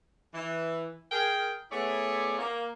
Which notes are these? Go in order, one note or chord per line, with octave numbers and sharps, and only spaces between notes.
E3
G#4 A#4 G5
A3 B3 E4 G#4 C#5 D5
A#3